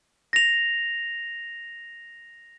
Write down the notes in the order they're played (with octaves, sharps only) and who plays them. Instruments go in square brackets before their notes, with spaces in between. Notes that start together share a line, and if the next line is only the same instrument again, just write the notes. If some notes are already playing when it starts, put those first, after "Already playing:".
[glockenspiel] A#6 F7